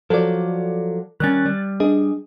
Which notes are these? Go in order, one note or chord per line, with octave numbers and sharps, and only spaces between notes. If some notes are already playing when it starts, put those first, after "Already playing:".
F3 F#3 A4 D5
D#3 G3 C#4 F#6 A6
G3
D4 G#4 D#5